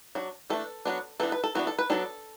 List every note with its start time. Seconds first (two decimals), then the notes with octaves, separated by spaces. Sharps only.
0.15 F#3 D4
0.50 E3 A3 D4 A4
0.85 F#3 B3 D4
1.20 E3 B3 D4 A4
1.32 B4
1.44 A4
1.55 E3 B3 D4 F#4
1.67 A4
1.79 B4
1.90 F#3 B3 D4 A4